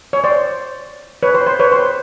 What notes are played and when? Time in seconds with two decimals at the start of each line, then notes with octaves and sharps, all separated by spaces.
0.13 C#5
0.24 C5 D5
1.23 B4 C#5
1.35 C5
1.47 C5
1.60 B4 C#5
1.72 C5